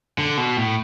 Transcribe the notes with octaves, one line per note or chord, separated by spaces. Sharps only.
D3
B2
A2